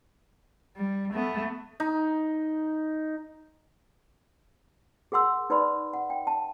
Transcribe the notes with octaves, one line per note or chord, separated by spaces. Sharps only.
G3
A3 B3
D#4
G#4 A#4 F#5 C6 E6
D#4 B4 D5 B5 C6
F#5
G5
A5